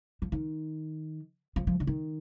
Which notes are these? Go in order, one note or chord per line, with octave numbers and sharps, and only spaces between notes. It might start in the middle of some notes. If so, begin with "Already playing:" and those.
F3
D#3
F3
F3
D3
D#3